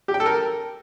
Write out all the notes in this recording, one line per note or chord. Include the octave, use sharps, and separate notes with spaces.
G4
G5
A4
A#4